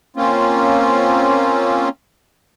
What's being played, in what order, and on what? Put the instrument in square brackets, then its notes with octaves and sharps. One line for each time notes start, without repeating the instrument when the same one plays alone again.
[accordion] A#3 C4 C#4 F4